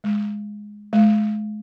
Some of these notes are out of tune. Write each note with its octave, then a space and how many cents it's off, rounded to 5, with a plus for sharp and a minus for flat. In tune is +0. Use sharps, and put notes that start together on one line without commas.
G#3 +0
G#3 +35